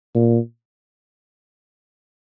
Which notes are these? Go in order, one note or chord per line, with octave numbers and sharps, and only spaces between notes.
A#2